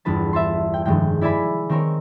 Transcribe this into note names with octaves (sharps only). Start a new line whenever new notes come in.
G1 E2 B4 A5
E5 A5 C6
G5
F1 G2 D#3 G#3 G5
E4 D5 E5 G#5 B5
D#3 C4 A#4 C#5